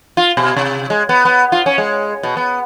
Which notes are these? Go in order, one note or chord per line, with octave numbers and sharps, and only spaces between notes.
F4
B2
C3
G#3
B3
B3
F4
C#4
G#3
B2
B3